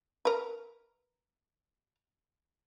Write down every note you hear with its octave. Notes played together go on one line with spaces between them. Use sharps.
A#4 B4